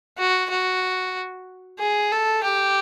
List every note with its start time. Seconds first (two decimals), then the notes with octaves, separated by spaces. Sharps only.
0.18 F#4
0.51 F#4
1.80 G#4
2.12 A4
2.44 G4